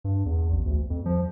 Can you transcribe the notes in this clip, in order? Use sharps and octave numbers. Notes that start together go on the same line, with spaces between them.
G2
E2
A1
D2
F2
F3